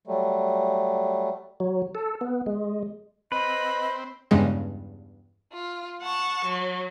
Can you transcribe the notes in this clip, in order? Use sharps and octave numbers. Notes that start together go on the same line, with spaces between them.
F#3 G3 A3
F#3
A4
B3
G#3
C4 B4 D#5 B5
E2 G2 C#3 G#3
F4
F#5 A5 C#6
F#3